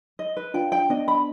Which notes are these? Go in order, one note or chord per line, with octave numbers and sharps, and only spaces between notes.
D#5
B4
D4 F4 G5
G5
B3 D4 D#5
B5